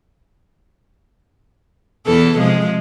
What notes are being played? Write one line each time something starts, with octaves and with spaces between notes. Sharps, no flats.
E2 E3 A4
C3 F3 G#3